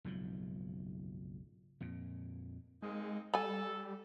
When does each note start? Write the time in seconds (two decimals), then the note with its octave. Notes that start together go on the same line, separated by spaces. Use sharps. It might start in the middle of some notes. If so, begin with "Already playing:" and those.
0.04 F#1 B1 G#2 F3
1.80 F2 A#2
2.82 G#3 A#3 C4 D#4
3.34 G3 A4 G#5 B5